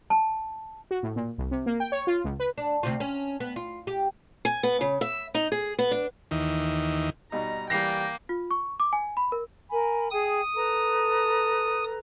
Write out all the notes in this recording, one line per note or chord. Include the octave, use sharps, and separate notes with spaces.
A5
F#4
A2
A#2
C2
C3
A#3
G5
C#5
F4
C#2
B4
D4
D2 C3 F4
C#4
B3
F4
G4
G#5
B3
C#3
E5
D#4
G#4
B3
D4
D#2 D#3 E3
B2 G3 D#4 A#5
E3 G3 A#3 G5 A#6 C7
F4
C#6
D6
G#5
B5
A#4
A#4 G#5 B5
G#4 G5 D#6
A4 B4 A#5